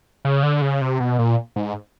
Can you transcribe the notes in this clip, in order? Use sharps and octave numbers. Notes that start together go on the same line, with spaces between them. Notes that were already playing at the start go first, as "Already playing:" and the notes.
C#3
D3
C#3
C3
B2
A#2
G#2